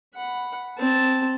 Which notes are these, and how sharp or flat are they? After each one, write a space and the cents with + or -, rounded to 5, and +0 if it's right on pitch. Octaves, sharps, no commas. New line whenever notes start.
F#5 +0 B5 +0
C4 +0 A5 +0